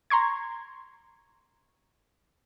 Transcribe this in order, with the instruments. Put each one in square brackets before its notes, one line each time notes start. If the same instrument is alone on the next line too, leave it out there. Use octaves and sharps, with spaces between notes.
[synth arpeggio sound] A#5 C6 C#6 G#6